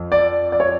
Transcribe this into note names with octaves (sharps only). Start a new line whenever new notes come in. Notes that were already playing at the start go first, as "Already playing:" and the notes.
Already playing: F2
D5
D5
C#5